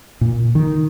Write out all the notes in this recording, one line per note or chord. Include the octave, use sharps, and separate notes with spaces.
A#2
D#3